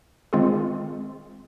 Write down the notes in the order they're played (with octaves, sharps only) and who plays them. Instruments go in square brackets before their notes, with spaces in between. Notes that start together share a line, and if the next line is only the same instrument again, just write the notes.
[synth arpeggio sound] D#3 G#3 C4 F4 G#4